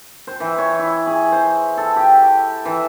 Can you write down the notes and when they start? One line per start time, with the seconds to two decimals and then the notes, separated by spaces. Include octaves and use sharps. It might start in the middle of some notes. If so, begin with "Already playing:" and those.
0.27 C5
0.40 E3
0.58 C#5
0.79 E4
1.07 G#4
1.32 C5
1.78 A4
1.96 G4
2.65 E3